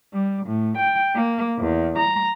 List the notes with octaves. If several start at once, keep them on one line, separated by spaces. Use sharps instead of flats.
G3
A2
G5
A#3
E2
A#5